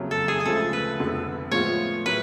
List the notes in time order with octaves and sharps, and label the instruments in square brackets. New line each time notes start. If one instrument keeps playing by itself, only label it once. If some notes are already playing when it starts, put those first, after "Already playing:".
Already playing: [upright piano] F#1 F2 C#3 F#3
[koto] A4
G#4
G#4
[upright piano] D2 C#3 F3 G#3 [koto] A4
[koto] B4
[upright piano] F1 F2 D3 G#3 B3
[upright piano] A2 F3 G#3 B3 F4 [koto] C#5
[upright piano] A2 F#3 [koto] B4